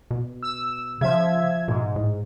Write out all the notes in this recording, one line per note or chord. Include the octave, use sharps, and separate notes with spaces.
B2
E6
C#3 F3 E5 G#6
G#2 B2
A2